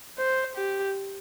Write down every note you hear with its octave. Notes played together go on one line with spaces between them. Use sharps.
C5
G4